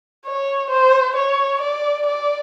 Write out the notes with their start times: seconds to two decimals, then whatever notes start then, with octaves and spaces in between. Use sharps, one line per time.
0.26 C#5
0.70 C5
1.16 C#5
1.62 D5
2.07 D5